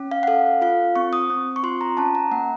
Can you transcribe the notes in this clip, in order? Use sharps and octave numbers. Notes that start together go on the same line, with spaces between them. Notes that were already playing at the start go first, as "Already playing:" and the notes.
Already playing: C#4
F5
F#5
A4 F5
F4 F5
C4 C#6
D#6
C4
C#6
F4 C6
A#5
C#4 A5
A#5
A#3 F#5